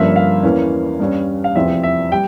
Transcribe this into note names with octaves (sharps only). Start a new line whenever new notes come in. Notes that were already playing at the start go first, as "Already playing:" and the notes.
Already playing: G1 G2 F3 A#3 C#4 E5
F5
E2 E3 A#3 C#4
G2 G3 C#4
F5
F1 E2 C3 F3 C4 E5
E5
G3 G5